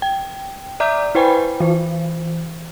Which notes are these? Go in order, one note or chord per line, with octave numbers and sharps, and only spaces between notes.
G5
D5 E5 A#5 D6 G6
E4 B4 C5 G5 G#5 B5
E3 C5